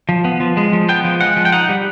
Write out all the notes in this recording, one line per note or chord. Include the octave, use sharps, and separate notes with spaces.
F3
B3
F3
G#3
F3
B3 G5
F3
G#3 F#5
F3
G5
D#4 F#5
G3